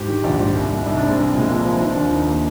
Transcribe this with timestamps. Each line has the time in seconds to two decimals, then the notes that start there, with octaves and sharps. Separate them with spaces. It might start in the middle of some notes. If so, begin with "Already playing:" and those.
Already playing: G#2 G4
0.08 D#3
0.24 A#1 F4
0.40 G#2
0.55 C2
0.71 C2
0.86 C2 D#4
0.97 D4
1.02 C3
1.07 G#3
1.17 C2
1.34 A#2 G#3
1.49 F3 A#3
1.65 F3
1.80 D#3 C4
1.91 D4
1.97 D#2 F4
2.12 D#2 D#4
2.27 A#3